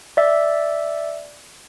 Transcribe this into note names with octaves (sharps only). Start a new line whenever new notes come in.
D5 E5